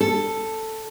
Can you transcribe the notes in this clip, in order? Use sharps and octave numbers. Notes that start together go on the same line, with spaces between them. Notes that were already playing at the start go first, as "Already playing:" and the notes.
A4